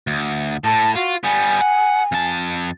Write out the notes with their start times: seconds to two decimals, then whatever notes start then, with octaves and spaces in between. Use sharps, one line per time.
0.07 D2
0.64 A2 A5
0.95 F4 F#4
1.24 G3 B3 G#5
1.61 F#5
2.12 F2 A5